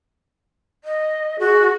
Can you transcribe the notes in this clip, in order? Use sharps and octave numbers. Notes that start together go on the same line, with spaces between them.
D#5
F#4 G#4